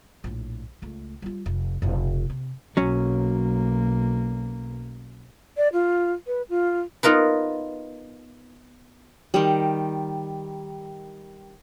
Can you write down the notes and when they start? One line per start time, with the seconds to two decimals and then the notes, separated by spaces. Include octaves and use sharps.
0.24 A#1 A2
0.82 C#2 A3
1.22 G3 F4
1.46 F1
1.82 F1 B2
2.30 C3
2.77 B1 F#3 A#3 C#4
5.57 D5
5.72 F4
6.26 B4
6.49 F4
7.03 B3 D#4 F4 A#4 B4
9.34 D#3 G3